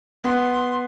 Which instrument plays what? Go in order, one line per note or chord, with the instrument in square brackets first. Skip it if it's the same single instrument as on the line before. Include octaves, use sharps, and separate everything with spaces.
[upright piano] B3 [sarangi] C6